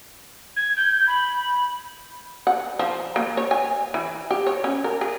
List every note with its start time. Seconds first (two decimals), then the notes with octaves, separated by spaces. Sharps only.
0.56 G#6
0.77 G6
1.07 B5
2.47 F#5
2.79 F3
3.16 A#3
3.37 C#5
3.51 G#5
3.94 E3
4.31 G4
4.47 C#5
4.64 C#4
4.84 A#4
5.01 G#4